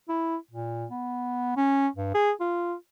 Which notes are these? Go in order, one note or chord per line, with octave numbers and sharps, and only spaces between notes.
E4
A#2
B3
C#4
G2
G#4
F4